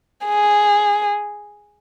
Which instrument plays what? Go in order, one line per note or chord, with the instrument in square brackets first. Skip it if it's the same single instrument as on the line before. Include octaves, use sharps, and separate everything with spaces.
[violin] G#4